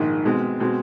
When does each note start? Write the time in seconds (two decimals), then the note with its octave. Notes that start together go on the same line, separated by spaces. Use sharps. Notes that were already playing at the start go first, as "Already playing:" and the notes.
Already playing: A#1 G#2 D#3 G#3
0.25 B2 G#3 C4
0.60 B2 G#3 C4